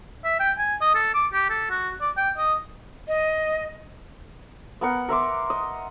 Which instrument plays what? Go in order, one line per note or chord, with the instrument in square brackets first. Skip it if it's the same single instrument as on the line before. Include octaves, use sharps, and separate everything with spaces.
[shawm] E5
G5
G#5
D#5
A4
D6
G4
A4
F#4
D5
G5
D#5
[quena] D#5
[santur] B3 A#4 F#5
A#4 E5 C6 D6
D#5